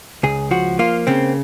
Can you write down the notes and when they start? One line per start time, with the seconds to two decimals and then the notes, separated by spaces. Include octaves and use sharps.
0.23 C#2 G#4
0.51 F3 F#4
0.79 A#3 F4
1.07 C#3 C4